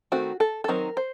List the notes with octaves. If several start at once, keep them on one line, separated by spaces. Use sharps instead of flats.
D#3 A3 C4 F#4
A4
A4
D#3 F#3 C4 D#4 A#4
C5